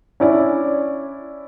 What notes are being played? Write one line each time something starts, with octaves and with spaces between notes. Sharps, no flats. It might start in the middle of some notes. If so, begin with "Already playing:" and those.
C#4 D4 E4 C#5 D5